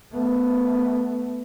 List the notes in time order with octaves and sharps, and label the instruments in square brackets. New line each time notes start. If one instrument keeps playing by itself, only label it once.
[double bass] A3 B3